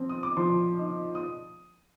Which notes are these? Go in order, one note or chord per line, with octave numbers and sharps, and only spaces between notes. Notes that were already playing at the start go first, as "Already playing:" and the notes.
Already playing: F3 C4
D#6
D6
F3 C6
D#4
D#6